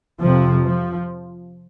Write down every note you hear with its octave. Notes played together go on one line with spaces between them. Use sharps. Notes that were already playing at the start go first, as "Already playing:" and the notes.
F2 C3 F3
F3